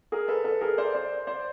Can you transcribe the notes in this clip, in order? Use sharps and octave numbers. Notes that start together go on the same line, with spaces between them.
G#4 A#4
A4 B4
A4 B4
G#4 A#4
C5 D5
C5 D5
C5 D5